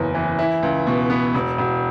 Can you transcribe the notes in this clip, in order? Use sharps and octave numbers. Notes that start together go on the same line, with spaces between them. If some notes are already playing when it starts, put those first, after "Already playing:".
Already playing: F#1 E2 C#4
E3
E4
C#2
B2
B3
E1
E1